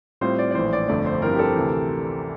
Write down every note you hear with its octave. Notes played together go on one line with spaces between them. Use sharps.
A2 G3 C4 F4 C5
D5
D5
A#1 A2 E3 C5
D5
G1 F2 D3 A3 D5
C5
G2 F3 C4 E4 A#4
G4
A4
D2 C3 E3